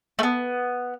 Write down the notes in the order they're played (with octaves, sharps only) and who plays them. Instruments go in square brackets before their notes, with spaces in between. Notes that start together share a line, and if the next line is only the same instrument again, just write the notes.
[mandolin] A3 B3